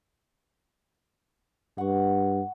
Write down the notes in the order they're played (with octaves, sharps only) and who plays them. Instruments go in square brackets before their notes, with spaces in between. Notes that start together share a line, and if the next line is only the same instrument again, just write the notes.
[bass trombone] G2 [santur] F#5 C#6